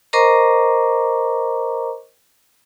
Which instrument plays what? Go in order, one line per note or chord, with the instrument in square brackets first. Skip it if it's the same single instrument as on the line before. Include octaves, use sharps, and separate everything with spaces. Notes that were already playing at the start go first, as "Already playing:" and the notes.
[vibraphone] A#4 C5 D#5 A#5 C#6 D6